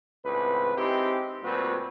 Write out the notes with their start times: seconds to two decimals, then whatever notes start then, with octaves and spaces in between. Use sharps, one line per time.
0.25 G#1 C#2 A2 C4 B4
0.77 G#3 C4 D#4 E4 G4
1.43 D2 A#2 G3 C4 F#4 B4